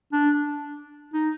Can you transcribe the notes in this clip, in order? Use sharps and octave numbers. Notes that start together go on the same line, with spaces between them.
D4
D#4